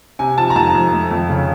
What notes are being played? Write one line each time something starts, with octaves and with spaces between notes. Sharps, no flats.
C3 G#5
F3 A5
A#5
F2 A5
F2
A3
F2
C#3